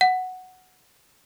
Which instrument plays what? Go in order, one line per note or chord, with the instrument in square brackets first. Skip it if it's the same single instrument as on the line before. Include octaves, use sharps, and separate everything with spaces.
[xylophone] F#5